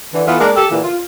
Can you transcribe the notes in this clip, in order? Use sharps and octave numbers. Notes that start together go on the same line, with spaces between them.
D3 E3
E3 B3 F4 A4
G#3 A#3 D4 A#4 D5
G4 A4
A#2 D3 E3
F4